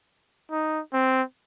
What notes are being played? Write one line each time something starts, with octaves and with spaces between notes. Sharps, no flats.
D#4
C4